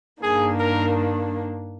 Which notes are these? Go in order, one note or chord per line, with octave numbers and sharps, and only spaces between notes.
G2 D#3 A#3 D4 G#4
A#4